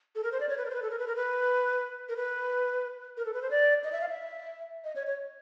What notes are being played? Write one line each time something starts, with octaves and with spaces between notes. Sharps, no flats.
A4
A#4
C5
D5
C#5
B4
A#4
C5
B4
A4
A#4
B4
A#4
B4
A#4
B4
A#4
A4
B4
C5
D5
D#5
E5
F5
E5
D#5
C#5
C#5